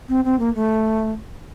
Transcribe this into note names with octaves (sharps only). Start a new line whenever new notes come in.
C4
C4
A#3
A3